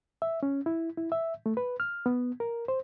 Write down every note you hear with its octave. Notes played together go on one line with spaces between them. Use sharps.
E5
C#4
E4
E4
E5
A3
B4
F6
B3
A#4
C5